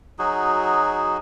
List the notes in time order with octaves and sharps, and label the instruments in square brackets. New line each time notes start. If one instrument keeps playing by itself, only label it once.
[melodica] F#3 D#4 F#4 G#4